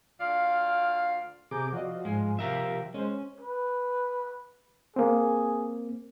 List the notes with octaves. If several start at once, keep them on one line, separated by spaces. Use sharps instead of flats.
D2 F4 D5 F5
C3 G#4 A#5 D6 G6
F3 F#4 D5 D#5
G#2 G#3 G#5
C3 G4 A#4 E5 F5
G#3 C#4 C5
B4
A#3 C4 G#4